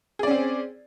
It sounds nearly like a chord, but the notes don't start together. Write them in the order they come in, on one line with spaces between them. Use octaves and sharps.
G#4 D5 C#4 C4